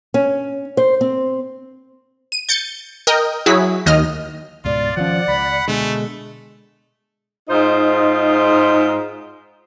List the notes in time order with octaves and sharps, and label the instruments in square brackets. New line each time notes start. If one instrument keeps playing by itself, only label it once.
[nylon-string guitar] C#4
C5
C4
[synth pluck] D#7
G6 A6 C#7
A#4 D#5 G5
F#3 E4 F#4 G#4 B6
D#2 D#5 D#6 F6
[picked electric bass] C#2 G#2 B2 [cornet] F4 [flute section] D5
[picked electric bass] D#3 C#4 [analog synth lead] F3 [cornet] F#5
[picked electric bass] C#2 [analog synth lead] B5
[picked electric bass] B2 D3 [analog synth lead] G#3 [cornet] A3
[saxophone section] G#2 D#4 F4 C5 D#5